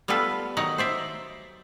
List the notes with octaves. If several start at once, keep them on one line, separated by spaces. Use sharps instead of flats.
G3 B3 F4 A4 B4
D#3 F#3 D#4 F#5
C5 D5 E5